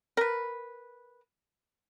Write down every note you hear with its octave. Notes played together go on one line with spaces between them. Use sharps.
A#4 B4